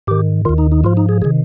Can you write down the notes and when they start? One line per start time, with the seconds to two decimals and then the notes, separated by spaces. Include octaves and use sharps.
0.07 G#2 D#3 G4
0.45 D#2 D#3 F4
0.58 D#4
0.72 D#4
0.84 G#2 F3 F4
0.97 D#4
1.09 G#4
1.22 C3 D#3 G#4